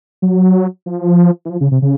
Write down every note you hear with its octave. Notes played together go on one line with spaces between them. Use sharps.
F#3
F3
E3
F3
C#3
C3
C#3